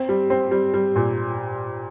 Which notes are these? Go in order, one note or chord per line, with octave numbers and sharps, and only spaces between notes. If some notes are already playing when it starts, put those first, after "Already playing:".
Already playing: C4
G3
C4
G3
G3
A#2